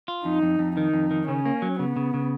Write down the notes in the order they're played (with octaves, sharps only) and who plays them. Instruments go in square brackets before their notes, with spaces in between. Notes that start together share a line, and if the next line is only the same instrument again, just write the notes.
[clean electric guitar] F4
[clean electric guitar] F2 [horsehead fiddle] D#4
[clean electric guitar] F2
F2
[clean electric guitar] D#3 [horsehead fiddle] D#4
[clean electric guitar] F2
D#3
[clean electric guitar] C#3 [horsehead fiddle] C#4
[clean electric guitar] A#3
F#3
[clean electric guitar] C#3 [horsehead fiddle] B3
[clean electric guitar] C#3
C#3